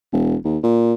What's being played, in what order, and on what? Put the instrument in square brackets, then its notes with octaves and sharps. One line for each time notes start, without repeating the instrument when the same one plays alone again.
[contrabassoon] E1
D#2
A#2